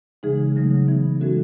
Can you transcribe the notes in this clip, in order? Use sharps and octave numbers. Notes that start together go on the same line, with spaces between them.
C#3 E3 G#3 D#4 G#4
C#3 F#3 A3 D#4
E3 B3 D#4
E3 G#3 C#4 F#4 A4